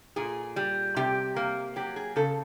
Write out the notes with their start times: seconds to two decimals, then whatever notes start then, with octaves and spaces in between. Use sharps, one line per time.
0.16 A#2 G#4
0.56 G3
0.96 C3 G4
1.36 A#3
1.76 F#3 G4
1.96 G#4
2.16 C#3 A4